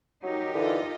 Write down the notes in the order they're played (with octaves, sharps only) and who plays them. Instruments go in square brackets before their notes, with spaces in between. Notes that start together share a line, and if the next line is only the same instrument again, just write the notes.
[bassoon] F#3 [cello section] D#4 G4 A#4
[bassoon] D3 [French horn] E3 [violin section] F4 A4 D#5